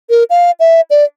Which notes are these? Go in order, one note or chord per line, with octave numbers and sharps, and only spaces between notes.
A#4
F5
E5
D5